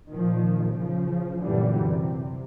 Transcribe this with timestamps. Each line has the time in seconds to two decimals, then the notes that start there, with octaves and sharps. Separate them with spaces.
0.11 A#2 D#3 F3
0.66 C#3 F3
1.42 F#2 A#2 D3 E3 G3
1.80 C3